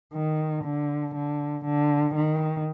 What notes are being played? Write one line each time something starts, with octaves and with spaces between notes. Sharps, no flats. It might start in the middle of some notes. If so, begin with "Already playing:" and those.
D#3
D3
D3
D3
D#3